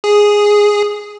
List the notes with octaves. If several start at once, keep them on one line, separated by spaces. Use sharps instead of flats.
G#4